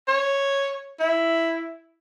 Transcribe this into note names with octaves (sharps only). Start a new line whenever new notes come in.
C#5
E4